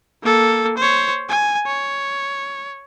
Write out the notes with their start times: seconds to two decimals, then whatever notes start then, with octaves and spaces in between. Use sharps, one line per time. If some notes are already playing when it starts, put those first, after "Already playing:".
0.23 A#3 A4
0.78 C5 C#5
1.29 G#5
1.67 C#5